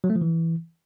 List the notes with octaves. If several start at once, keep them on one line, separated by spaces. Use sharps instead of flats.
F#3
A3
F3
E3